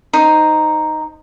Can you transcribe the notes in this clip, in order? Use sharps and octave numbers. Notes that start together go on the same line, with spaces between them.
D#4 C5